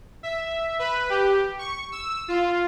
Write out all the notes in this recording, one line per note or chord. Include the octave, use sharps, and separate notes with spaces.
E5
B4
G4
C#6
E6
F4